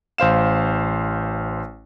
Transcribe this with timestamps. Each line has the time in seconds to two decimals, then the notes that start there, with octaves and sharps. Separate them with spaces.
0.18 A1 C5 F5 E7